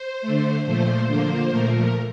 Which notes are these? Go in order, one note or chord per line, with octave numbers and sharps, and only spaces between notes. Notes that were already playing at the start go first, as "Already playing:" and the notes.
Already playing: C5
A3
D3
A#2 F3 A3 C5
D3 F3 A#3
A#2 F3 A3 A#4